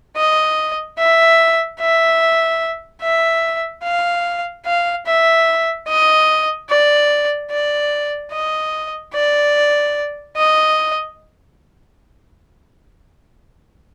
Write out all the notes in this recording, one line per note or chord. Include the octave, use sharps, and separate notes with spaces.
D#5
E5
E5
E5
F5
F5
E5
D#5
D5
D5
D#5
D5
D#5